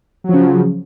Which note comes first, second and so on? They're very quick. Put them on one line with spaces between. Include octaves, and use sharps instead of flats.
F#3 F3 C#3